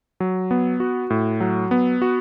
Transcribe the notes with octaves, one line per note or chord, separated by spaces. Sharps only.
F#3
B3
F#4
A2
F#3
B3
F#4